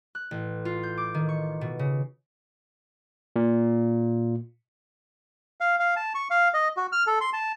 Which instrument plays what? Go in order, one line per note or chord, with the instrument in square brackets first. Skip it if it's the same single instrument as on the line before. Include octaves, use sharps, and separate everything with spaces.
[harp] F#6
A1
F4
G6
D6
D#3
C#6
B2
C#3
[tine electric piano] A#2
[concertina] F5
F5
A5
C#6
F5
D#5
F#4
F6
A4
C6
A5